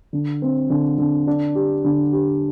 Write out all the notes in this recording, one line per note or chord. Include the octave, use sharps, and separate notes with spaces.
D3
C4
D3
D3
D4
G4
D3
G4